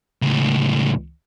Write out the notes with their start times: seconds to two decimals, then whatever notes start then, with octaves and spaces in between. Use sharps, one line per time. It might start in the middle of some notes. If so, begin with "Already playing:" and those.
0.22 C#2 A2